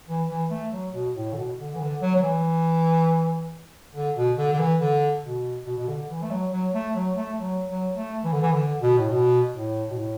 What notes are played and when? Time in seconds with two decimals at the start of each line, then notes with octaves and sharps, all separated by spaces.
0.08 E3
0.30 E3
0.51 A3
0.72 F#3
0.94 B2
1.15 A2
1.33 D3
1.37 B2
1.59 D3
1.75 E3
1.80 D3
2.02 F#3
2.15 F#3
2.22 E3
3.95 D3
4.16 B2
4.37 D3
4.53 D3
4.59 E3
4.80 D3
5.24 B2
5.66 B2
5.78 B2
5.88 D3
6.10 E3
6.23 A3
6.31 F#3
6.53 F#3
6.74 A3
6.95 F#3
7.17 A3
7.39 F#3
7.67 F#3
7.96 A3
8.24 E3
8.33 D3
8.42 E3
8.53 D3
8.82 B2
8.99 A2
9.11 B2
9.53 A2
9.91 B2
9.97 A2